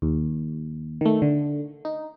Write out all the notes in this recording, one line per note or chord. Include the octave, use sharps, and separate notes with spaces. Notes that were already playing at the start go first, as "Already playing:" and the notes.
D#2
D#3 A3
D3
D#4